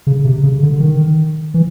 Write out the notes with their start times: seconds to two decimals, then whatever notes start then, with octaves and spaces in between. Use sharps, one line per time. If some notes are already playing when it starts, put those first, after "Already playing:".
0.07 C#3
0.25 C3
0.43 C#3
0.63 D3
0.80 D#3
1.54 E3